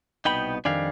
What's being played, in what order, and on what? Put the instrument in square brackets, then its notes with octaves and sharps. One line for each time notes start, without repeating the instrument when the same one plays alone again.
[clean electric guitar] C2 B2 B3 D#4 G5 B5
F2 D#3 G3 D4 F5 G#5